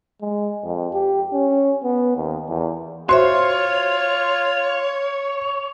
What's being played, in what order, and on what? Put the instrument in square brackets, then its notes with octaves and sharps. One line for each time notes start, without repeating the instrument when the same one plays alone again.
[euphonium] G#3
F2
G4
C#4
B3
D#2
E2
[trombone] F4 [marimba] F#4 C5 E5 [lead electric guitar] C#5 [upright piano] C6